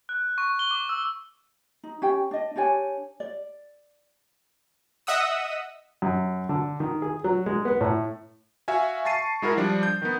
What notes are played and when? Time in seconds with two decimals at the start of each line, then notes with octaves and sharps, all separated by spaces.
0.09 F#6
0.38 C#6
0.59 G7
0.71 D6
0.89 E6
1.83 D#4
2.02 C#4 G4 G5
2.31 D4 D#5
2.56 D4 G4 C#5 G#5
3.20 D5
5.07 D#5 E5 F#5 D#6 E6
6.02 F#2
6.49 D3
6.80 D#3
7.02 G#4
7.24 F#3
7.46 G#3
7.65 B3
7.81 A2
8.68 F#4 E5 F5 G#5
9.05 A5 C#6 A6 C7 D#7
9.42 G#3 E4 F#4 A#4
9.57 F3 G3 D4
9.83 G6
10.02 D#3 B3